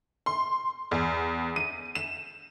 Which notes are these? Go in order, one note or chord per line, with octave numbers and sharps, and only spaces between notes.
C6
E2
D#7
E7